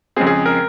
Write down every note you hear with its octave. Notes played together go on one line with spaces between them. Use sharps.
F2 C#3 G#3 C4 G#4
G#4
A#4